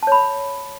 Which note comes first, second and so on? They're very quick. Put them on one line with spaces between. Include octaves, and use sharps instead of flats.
A5 C#5 B5